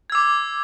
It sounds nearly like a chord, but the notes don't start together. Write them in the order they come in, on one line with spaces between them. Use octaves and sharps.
G#6 E6 D6